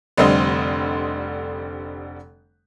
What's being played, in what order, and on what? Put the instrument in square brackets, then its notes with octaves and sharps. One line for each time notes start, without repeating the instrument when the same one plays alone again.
[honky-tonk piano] F1 D3 G3 C4 D#5 C6